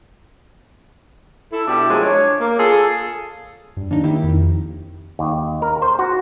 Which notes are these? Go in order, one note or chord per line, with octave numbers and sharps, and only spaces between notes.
E4 A4
B2 D4 E4 G4
F#2 F3 G#3
D4 C#5
A#3
F4 G#4 A4
G2
D#2 D4 D#4
D#3 A#3 E4 G4
F2
D#2
A#4
C5
F#4